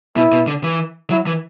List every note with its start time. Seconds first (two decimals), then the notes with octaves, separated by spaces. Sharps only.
0.17 B2 E4
0.32 B2
0.47 D3
0.64 E3
1.10 F#3 E4
1.27 E3